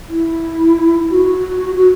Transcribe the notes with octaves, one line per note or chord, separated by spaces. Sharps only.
E4
F#4
F#4